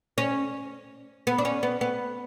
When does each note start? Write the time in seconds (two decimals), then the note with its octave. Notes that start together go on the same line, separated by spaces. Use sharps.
0.18 C#4
1.27 B3
1.38 D4
1.45 C#4
1.63 B3
1.81 B3